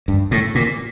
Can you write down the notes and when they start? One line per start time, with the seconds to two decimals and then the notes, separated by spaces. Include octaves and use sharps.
0.08 G2
0.31 A2
0.55 A#2